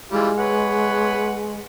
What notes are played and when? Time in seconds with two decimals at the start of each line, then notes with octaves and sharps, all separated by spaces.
0.11 E3 G3 G#3 F4
0.38 B4 C#5 F#5